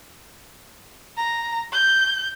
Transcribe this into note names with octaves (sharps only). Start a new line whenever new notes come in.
A#5
G6